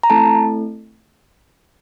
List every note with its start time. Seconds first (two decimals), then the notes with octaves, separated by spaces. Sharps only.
0.03 A#5
0.10 A3 C4 E4 A4 A5